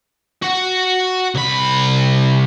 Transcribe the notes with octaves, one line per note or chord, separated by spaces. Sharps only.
F#4 F#5
C2 B5